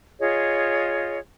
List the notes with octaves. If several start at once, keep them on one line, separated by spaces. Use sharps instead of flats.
F4 G#4 C#5 D#5